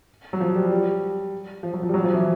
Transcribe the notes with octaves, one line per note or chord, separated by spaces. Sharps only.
F#3
F3
G3
G3
F3
F#3
F3
G3
F#3
F3
E3